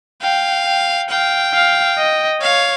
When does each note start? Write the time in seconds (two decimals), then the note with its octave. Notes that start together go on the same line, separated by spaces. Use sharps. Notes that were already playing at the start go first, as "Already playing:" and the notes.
0.22 F5 G5
0.66 G5
1.10 F5 G5
1.54 F5
1.98 D#5
2.42 C#5 F5